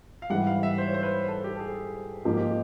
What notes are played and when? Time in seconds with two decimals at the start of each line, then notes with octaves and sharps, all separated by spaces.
0.22 F5
0.30 G#2 E3 G3 F#5
0.47 F5
0.63 E5
0.78 C5
0.87 C#5
0.94 C5
1.03 B4
1.28 A4
1.44 G4
1.56 A4
1.60 G#4
2.25 G#2 F3 A#3 D#4 G4
2.37 G4